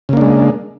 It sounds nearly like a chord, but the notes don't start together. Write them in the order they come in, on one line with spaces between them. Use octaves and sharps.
C#3 A#3 D4 G#3